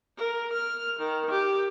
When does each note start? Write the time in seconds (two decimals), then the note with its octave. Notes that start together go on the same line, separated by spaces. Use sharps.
0.18 A#4
0.52 F6
1.00 D#3
1.31 G4